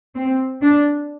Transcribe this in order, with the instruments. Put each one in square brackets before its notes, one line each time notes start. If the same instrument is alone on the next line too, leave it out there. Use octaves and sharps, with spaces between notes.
[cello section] C4
D4